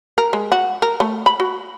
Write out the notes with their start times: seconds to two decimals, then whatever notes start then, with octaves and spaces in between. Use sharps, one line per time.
0.18 A#4
0.33 G#3
0.52 F#4
0.82 A#4
1.00 A3
1.26 B5
1.40 F#4